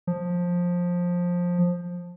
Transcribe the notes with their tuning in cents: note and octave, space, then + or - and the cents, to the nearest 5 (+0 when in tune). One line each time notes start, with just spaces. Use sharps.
F3 +15